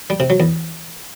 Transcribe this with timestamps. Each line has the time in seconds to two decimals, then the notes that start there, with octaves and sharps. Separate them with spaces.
0.10 G3
0.20 C3
0.30 F#3
0.40 E2